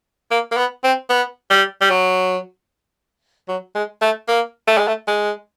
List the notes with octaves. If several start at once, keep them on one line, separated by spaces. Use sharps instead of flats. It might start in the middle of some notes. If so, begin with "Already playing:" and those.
A#3
A#3
B3
C4
B3
G3
G3
F#3
F#3
G#3
A3
A#3
A3
G#3
A3
G#3